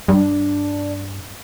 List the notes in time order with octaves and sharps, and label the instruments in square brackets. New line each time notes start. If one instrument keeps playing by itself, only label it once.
[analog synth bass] G2 [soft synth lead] D4